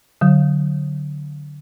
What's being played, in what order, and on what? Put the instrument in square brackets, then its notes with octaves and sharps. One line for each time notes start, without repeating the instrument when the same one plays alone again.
[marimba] D3 F#3